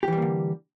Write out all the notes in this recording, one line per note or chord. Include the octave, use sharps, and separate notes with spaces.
D3 E3 G3 A#3 G4